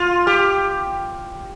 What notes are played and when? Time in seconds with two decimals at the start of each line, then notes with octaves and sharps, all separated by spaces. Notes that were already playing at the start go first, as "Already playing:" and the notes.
Already playing: F4
0.27 G4